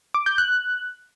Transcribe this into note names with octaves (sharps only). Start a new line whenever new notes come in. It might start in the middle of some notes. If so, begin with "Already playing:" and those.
D6
G6
F#6